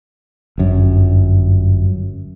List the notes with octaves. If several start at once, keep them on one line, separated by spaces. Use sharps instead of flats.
G1 F#2